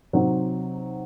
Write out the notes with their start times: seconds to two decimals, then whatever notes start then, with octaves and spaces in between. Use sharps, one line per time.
0.13 C3 F#3 C4 D#4